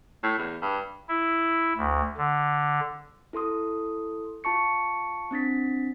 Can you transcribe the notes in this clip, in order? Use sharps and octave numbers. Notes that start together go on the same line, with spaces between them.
A2
E2
G2
E4
D2
D3
E4 A4 C6 D#6
F4 A5 C#6 C#7
C4 D4 A6 B6